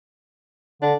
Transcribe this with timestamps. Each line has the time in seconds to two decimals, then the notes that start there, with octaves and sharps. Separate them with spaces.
0.82 D3 D4